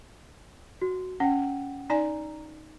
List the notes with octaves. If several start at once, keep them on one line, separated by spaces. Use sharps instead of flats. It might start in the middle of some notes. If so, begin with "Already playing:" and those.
F#4
C#4 F#5 G5
D#4 D5 G#5 A#5